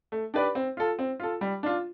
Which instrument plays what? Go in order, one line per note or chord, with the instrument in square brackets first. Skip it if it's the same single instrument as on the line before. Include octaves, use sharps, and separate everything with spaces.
[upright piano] A3
D4 G4 B4 D5
C4
F4 A4
C4
F4 A4
G3
D4 F4